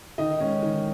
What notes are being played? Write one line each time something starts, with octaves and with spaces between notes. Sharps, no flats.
D#3 D#4 D#5
G#3 C#4
D#3